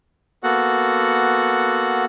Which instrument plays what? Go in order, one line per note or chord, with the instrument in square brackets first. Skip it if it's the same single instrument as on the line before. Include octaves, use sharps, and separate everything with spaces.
[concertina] A#3 B3 F#4 A4 F#5